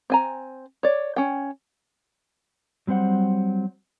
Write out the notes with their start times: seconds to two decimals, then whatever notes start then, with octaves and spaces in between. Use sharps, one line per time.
0.10 C4 G#5 A#5
0.83 C#5 D5
1.16 C#4 G5
2.87 F#3 G3 C4 C5 F#5